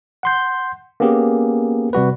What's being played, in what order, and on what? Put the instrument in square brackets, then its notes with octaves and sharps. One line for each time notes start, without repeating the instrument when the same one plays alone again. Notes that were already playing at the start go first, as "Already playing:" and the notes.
[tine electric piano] F#5 C6 G6
A#3 B3 C#4 G4 G#4
C3 G3 F#4 B4